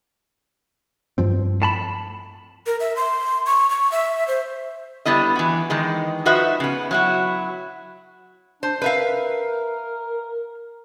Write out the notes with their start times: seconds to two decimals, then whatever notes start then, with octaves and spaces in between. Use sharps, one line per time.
1.18 G2 F3 C4
1.62 A2 A5 B5
2.66 A#4
2.80 E5
2.96 C6
3.46 C#6
3.70 C#6
3.92 E5
4.28 C5
5.05 D3 G3 B3 E4 D#5
5.35 E3 F#4
5.70 D#3 E3 G#3
6.25 F3 D#4 F#4 B4 E5
6.60 C#3 B3
6.91 F#3 E4 F#4
8.63 D4 C5
8.82 A#4 B4 E5 F5